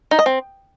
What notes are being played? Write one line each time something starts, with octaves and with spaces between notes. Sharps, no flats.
D#4
D#5
C4